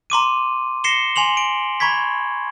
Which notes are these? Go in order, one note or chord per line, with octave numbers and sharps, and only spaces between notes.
A#5 C6 D6 D#7
A#6 C7 C#7 E7 G7
G#5 C6 F7 F#7
D7
A#5 B5 C#6 G#6 B6